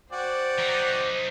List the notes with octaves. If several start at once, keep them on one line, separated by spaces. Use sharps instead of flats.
F#4 C5 D5 G5
F#3 D#4